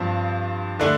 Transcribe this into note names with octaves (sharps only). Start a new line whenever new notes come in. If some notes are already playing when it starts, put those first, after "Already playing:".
Already playing: G2 F3 C4
D3 A3 D4